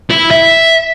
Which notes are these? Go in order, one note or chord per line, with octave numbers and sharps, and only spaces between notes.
E4
E5